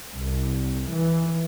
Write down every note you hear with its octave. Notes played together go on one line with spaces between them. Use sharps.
C2
E3